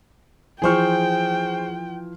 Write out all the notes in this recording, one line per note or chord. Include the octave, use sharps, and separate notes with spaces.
E3 F3 G#4 C5 G5 C#6 F6